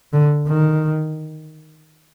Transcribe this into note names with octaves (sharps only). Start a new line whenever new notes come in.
D3
D#3